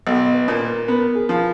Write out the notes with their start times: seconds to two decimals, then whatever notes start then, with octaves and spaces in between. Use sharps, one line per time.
0.07 B1
0.34 B4
0.48 A#2
0.61 A#4
0.88 B3 A#4
1.15 G#4
1.29 F3